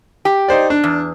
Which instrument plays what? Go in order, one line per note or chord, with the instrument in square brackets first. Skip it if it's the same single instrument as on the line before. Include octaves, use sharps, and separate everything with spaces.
[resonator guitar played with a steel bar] G4
[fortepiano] D#4 C5 D5
D4
[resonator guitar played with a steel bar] E2